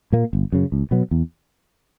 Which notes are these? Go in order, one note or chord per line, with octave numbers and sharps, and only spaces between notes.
A#2 A#3
G1
F#2 C#3
C#2
B2 F#3 B3
E2